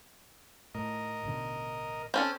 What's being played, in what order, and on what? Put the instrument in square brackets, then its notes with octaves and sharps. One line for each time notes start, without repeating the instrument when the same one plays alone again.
[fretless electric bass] A2 [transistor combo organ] A#4 D#5
[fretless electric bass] A1 B2 D3
[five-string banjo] C4 C#4 A4